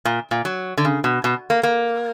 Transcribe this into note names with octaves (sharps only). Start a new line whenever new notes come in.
A#2
A#2
F#3
D3
C#3
B2
B2
A#3
A#3